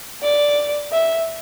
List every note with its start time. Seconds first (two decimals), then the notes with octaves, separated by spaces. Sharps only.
0.23 D5
0.92 E5